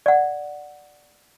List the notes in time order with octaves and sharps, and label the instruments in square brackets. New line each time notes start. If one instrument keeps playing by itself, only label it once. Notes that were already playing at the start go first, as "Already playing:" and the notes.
[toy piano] D5 F#5